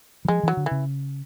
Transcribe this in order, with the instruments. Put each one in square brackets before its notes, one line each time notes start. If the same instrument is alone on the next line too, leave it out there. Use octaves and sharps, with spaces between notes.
[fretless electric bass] E3
[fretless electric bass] F3 [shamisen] G#3
[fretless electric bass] E3 [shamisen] F#3
[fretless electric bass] D3
[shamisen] E3
[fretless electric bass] C#3